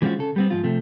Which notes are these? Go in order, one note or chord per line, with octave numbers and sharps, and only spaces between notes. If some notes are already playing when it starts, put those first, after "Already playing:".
E3 G#3 C4 C#4 F4 F#4
C#3 A4
G3 B3 C4
G#2 F3 F4
C3 F3 A3